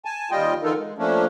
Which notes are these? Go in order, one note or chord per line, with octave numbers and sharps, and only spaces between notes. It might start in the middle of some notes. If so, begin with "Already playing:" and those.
G#5 A5
D#2 G3 F4 D#5 G5
D3 E3 D#4 F4 A4 A#4
G#3
F3 A3 A#3 C#4 D4